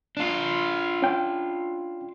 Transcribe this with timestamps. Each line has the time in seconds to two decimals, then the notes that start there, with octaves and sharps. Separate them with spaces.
0.17 D4 F4
1.02 C#4 G5